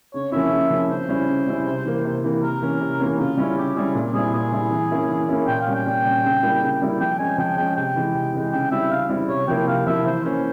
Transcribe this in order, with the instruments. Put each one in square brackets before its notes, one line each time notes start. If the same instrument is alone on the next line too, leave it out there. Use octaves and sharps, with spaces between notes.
[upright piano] C#3 [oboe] C#5
[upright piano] F3 A#3 C#4 E4 [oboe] E5
[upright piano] C#3
F3 A#3 C#4 E4
[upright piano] C#3 [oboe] C5
[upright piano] G3 C#4 E4
C#3
G3 C#4 E4
C3
E3 A#3
C3
E3 A#3
[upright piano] C3 [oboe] A#4
[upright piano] E3 A#3 C#4
C3
E3 A#3 C#4
[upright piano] C#3 [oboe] F4
[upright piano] G3 C#4 E4
[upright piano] C#3 [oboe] G4
[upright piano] G3 C#4 E4 [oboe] G#4
[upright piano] A#2
[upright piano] G3 C4 E4 [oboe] G#4
[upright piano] A#2 [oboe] G#4
[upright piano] G3 C4 E4
E3
A#3 C#4 E4
E3
A#3 C#4 E4
[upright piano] A#2 [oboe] G5
[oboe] F5
[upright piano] G3 C#4
[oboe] G5
[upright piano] A#2
G3 C#4
C#3
G3 A#3 E4
C#3
G3 A#3 E4
[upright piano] F3 [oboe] G5
[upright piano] G#3 C#4 [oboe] G#5
[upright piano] F3 [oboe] G5
[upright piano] G#3 C#4 [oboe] G5
[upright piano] C3 [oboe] G5
[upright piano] E3 G#3
C3
E3 G#3
[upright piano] C#3 [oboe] G5
[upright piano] G3 C4 E4 [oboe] E5
[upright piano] C#3 [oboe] F5
[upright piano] G3 C4 E4
[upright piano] C3 [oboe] C#5
[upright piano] F3 A#3 E4 [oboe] G5
[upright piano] C3 [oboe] F5
[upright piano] F3 A#3 E4 [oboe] E5
[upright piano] E3 [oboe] C5
[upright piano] A#3 C#4 E4 [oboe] C5